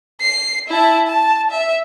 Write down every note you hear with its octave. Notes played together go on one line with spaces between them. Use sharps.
C7
E4 A5
A5
E5